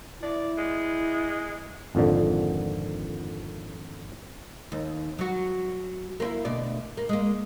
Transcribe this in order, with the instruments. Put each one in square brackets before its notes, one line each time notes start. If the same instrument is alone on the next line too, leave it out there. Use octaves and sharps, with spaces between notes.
[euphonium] E4 [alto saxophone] D5
[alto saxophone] G#3
[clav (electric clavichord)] G#1 F2 A#2 D3
[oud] D#2
F#3 F#4
A#3 C4 E4
D2 B2 D5
A#3
G#3 A#3